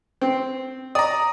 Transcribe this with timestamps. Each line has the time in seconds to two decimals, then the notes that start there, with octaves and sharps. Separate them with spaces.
0.21 C4
0.95 D5 A#5 D#6